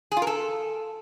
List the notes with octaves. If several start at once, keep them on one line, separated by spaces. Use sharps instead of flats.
G#4
F4
A#4
A4